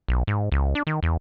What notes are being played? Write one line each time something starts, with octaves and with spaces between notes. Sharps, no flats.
B1
G#2
C#2
D4
D#3
E2